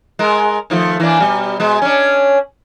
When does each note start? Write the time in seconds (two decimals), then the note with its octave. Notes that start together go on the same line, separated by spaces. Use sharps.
0.19 G#3 A#4
0.70 D#3 F3 A3
1.00 E3 A#3 D4
1.20 B2 G3
1.60 B2 G#3
1.82 C#4 D4